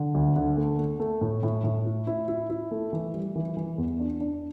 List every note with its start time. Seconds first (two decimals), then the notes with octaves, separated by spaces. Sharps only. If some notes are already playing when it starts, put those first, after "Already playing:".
Already playing: D3
0.14 D2
0.36 D3
0.57 A3
0.79 A3
1.00 A3
1.21 A2
1.43 A2
1.64 A2
1.85 E4
2.07 E4
2.28 E4
2.50 E4
2.71 A3
2.93 E3
3.14 G3
3.36 E3
3.57 E3
3.78 E2
4.00 D4
4.21 D4